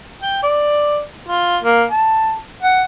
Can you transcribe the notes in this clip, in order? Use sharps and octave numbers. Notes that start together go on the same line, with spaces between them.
G5
D5
F4
A#3
A5
F#5